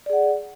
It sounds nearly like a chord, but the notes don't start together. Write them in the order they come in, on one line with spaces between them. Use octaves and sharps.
D5 G#4 F#5